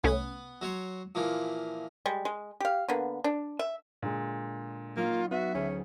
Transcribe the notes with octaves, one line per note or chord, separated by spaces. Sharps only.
C2 A3 B3 C#4 B4
F#3 C#5 C6
A#2 E3 F3
G3 G#3
G#3
G4 F5
D3 A#3 B3
D4
E5
A#2 D3 G#3
F#3 A#3 C#4 D#4 F4
B3 F#4 E5
D2 B3 C#4 G#4